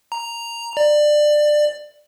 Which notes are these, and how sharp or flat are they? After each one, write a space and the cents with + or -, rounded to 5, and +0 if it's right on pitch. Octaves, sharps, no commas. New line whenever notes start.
A#5 +0
D5 +20